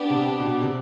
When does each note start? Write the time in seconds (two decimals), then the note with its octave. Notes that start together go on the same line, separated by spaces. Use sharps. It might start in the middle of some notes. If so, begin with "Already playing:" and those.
Already playing: B3 D4 G4
0.10 C3
0.40 B2
0.62 C3